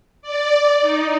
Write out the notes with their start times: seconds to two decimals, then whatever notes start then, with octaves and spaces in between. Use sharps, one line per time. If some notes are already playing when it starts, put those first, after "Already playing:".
0.22 D5
0.81 D#4